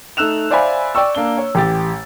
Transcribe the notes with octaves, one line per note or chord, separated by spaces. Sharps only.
A3 D#4 E6 F#6 E7 F7
C5 D5 E5 F5 G#5 B5
D5 G5 C#6 E6
A#3 D4 G7
C#5
A1 G4 A6